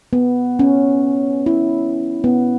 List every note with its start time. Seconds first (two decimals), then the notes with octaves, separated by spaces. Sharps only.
0.13 B3
0.59 C#4
1.46 E4
2.24 B3